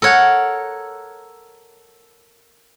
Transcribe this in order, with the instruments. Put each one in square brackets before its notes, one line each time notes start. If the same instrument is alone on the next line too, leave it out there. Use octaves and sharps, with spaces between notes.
[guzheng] A4 A#4 C#5 F#5